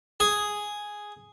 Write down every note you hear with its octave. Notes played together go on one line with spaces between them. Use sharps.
G#4